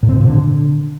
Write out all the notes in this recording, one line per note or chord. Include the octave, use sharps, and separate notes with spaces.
A2
C4
B2
A#2
D3